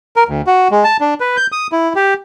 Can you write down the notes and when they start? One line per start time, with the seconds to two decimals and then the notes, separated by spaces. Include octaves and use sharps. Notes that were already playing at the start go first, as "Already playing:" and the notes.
0.16 A#4
0.28 D2
0.47 F#4
0.71 G#3
0.84 A5
1.01 D4
1.20 B4
1.37 G6
1.52 D#6
1.72 E4
1.96 G4